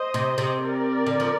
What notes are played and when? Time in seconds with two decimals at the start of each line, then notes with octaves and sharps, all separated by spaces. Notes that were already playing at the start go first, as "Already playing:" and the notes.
Already playing: C5 D#5
0.14 C3
0.38 C3
0.61 A#4 D5
1.07 D3
1.20 F3